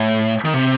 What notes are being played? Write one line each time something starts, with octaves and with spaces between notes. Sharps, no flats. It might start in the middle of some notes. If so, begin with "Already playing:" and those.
Already playing: A2
D#3
C3